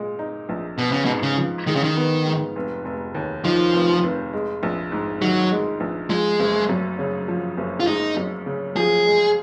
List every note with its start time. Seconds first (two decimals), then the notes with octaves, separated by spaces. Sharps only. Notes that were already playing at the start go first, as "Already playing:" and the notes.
Already playing: A#2 G#3
0.19 D#4
0.49 A#1
0.78 B2 B3
0.92 C#3
1.05 B2
1.09 G#2
1.23 C#3
1.37 F3
1.67 D#3 G#3
1.75 C#3
1.84 D#3
1.97 B3
2.26 G#2
2.56 F1
2.85 F1
3.15 D#2
3.44 D#3 F3
3.73 F1
4.03 F1
4.33 G#3
4.63 A#1
4.92 G#2
5.21 D#3 F#3
5.51 G#3
5.80 A#1
6.10 F3 G#3
6.40 F#1
6.69 F#2
6.99 C#3
7.28 F3
7.58 F#1
7.80 F4
7.87 G#3 D#4
8.17 F#2
8.46 C#3
8.76 F3 G#4
9.06 G#3